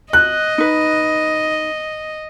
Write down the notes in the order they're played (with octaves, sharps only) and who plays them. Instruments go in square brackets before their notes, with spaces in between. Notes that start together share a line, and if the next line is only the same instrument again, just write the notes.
[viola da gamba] D#5 [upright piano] F#6
[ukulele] D#4 B4